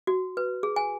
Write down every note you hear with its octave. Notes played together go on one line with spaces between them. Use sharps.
F#4
B4
G#4
G#5